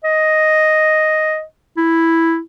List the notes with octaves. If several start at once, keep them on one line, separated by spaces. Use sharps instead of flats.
D#5
E4